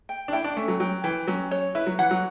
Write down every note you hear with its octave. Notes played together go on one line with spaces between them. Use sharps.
G5
D4
E4 G5
D4
A3 C#4
F#3
F#3 G5
E3 G5
F#3 C#4
C#5
E4 B4
F#3
E3 F#5
F#3